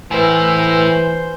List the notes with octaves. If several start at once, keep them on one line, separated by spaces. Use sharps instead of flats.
A2 E3 E4 B4 C5 G#5